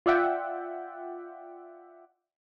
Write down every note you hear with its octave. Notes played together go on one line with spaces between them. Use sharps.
F4 D5 E5 F#5 G5